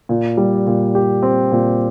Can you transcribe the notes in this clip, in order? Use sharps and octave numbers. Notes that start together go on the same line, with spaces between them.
A#2
G3
A#2
G4
C4
A#2